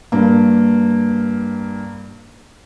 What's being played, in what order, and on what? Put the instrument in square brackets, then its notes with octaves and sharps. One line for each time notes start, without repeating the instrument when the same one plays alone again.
[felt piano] G2 A#3